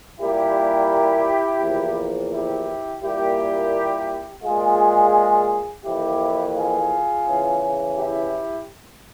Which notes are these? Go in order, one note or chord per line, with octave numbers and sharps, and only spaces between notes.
A#2 G3 A#3 E4 G4
E2 C3 F3 A#3
E4 G4
A#2 G3 A#3 E4 G4
A#2 G#3 F4 G#4
F2 E3 A#3 E4 G4
F4 G#4
E2 C#3 E3
E4 G4